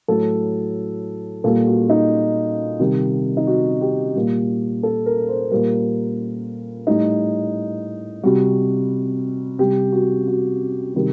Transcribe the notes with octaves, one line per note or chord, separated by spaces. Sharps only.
A2 F#3 A4
A#2 G3 A4
F#4
D#4
C3 D#3 G3
D#4
F#4
G4
A#2 G3
A4
A#4
C5
A#2 G3 A#4
A2 G3 D#4
C3 G3 F#4
C3 G3 G4
F#4
F#4
C3 D#3 G3